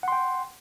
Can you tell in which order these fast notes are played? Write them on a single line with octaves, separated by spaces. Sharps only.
F#5 C6 G5